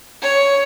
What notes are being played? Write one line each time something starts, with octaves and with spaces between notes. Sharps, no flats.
C#5